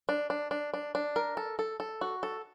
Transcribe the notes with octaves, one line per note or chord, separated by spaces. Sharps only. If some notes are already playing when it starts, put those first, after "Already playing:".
D4
D4
D4
D4
D4
A#4
A4
A4
A4
F#4
A4